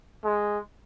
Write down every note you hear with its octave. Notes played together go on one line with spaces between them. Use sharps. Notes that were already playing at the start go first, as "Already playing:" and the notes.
G#3